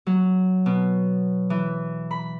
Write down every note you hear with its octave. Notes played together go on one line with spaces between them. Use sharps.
F#3
B2
E3
B5